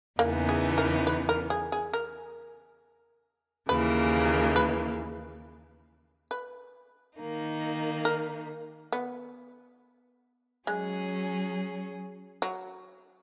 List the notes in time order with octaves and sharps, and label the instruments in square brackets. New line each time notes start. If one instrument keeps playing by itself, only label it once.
[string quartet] E2 C#3 E3 B3 D#4 [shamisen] A#3
[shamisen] G#4
A#4
B4
A#4
G#4
G#4
A#4
[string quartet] D#2 C#3 E3 A#3 [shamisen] B4
[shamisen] B4
B4
[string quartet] D#3 A#3 D#4
[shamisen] A#4
B3
[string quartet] F#3 C#4 G#4 [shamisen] G#3
[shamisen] F#3